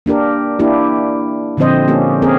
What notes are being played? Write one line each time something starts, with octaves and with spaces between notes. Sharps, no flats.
A#3 D4 G4 A#4
A#3 D4 E4 G4
A#2 D3 F3 C4 C5 D#5
A#3 C#4 G4 A4
C4 C#4 G#4 A#4